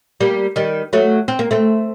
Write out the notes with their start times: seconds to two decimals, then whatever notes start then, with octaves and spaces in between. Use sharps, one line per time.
0.20 G3 A#3
0.56 D#3 G3
0.93 F#3 A3
1.28 C4
1.39 A#3
1.51 A3 C4